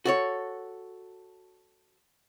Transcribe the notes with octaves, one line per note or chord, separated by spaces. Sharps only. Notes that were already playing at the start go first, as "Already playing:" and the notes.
F#4 A4 C#5